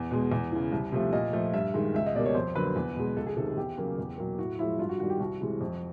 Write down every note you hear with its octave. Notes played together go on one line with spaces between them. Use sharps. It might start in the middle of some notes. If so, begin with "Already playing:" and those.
Already playing: E2
B2 G#3
E2
C#3 E3
C2
C3 F3 A3
A#2 D#5
F3 A3
G2 E5
D#3 G#3
C#2 E5
D#5
B2 G3 A#3 D5
C#5
F2 C5
D3 F#3 A#3 B4
E2
B2 G#3
C#2 A4
G#4
C3 D#3 A4
A4
E2 G4
C#3 F#3 A#3
E2
B2 F#3 A#3
A2 F#4
F3 G#3 E4
G2 F4
F#4
D#3 G3 F#4
G4
C2 F#4
C3 E3 G#3
F2